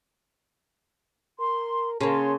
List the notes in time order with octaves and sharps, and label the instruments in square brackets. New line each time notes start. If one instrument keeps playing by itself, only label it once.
[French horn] A#4 [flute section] C6
[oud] C#3 A#3 [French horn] C#4 [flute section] A5 C6